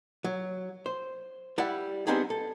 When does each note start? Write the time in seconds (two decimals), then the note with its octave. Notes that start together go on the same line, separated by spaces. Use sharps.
0.24 F#3
0.86 C5
1.58 G3 E4 D5 F#5
2.07 G3 B3 C4 D4 D#4 G#4
2.30 A4